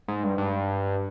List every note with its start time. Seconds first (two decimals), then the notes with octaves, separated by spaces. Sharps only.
0.08 G#2
0.24 G2
0.38 G2